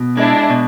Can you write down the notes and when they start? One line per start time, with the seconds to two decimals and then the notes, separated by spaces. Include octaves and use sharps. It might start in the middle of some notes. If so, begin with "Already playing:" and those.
Already playing: B2
0.17 G#3 D4 E4
0.50 B2